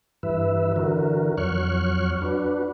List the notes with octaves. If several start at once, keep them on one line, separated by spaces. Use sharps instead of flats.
G2 E3 B4 E5
D3 E3 F#4 A#4
F2 F#3 C#5 C#6 F6 F#6
D4 F#4 B4